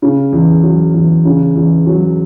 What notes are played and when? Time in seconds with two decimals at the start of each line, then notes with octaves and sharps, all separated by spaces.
0.02 C#3
0.32 E2
0.63 F#3
0.94 E2
1.25 C#3
1.55 E2
1.87 F#3